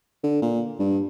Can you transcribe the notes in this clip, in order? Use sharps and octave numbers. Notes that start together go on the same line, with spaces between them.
D3
A#2
G2